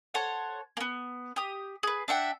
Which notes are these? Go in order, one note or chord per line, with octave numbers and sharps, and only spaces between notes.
A4 C5 C#5 F#5
A#3 B3
G4 D#6
G#4 B4
D4 E5 F#5 G5